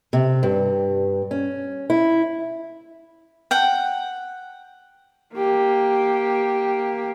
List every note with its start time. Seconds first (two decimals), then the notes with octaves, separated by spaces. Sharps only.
0.13 C3
0.43 G2
1.31 C#4
1.90 E4
3.51 F#5 G5
5.34 A#3 G4